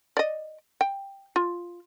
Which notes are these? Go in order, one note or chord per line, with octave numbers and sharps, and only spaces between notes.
D5 D#5
G5
F4